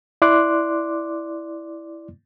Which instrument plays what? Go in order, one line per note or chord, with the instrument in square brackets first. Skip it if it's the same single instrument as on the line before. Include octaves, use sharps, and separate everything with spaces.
[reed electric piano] E4 D5 C6 D6 F#6